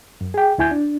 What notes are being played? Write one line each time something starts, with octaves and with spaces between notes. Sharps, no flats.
F#2
G#4 G5
D2 E4 G#5 G6
D4